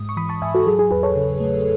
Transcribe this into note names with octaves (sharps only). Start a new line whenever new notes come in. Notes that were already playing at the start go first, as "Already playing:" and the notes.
Already playing: G#2 G#3 D#6
C#6
E3 B5 D#6
A5 C#6
G#2 E5 G#5
F#4 A4
F#3 G#4
G#4
E2 G#4 B4
A4 C#5
C#3
A3